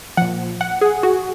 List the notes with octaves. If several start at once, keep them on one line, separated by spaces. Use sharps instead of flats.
A#2 F3 F#5
F#5
G#4
F#4